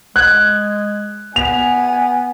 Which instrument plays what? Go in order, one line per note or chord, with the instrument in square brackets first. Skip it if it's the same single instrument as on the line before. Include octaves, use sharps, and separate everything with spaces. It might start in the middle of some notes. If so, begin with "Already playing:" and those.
[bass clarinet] G#3 [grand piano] F#6 G#6
[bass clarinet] B3 [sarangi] G#5 [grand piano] F7